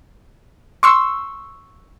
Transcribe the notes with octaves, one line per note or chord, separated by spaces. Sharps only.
C6 C#6 E6